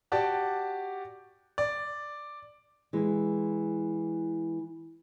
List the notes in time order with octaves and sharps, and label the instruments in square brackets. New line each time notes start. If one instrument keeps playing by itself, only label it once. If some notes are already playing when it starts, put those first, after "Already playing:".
[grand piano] F#4 G4 D5 A5
D5
[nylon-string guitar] E3 G#3